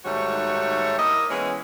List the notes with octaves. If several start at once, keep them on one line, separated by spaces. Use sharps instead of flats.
G#2 D#3 G3 A3 F#4 C#5
A#3 E4 A#4 D#5
E3 G#3 B3 C#4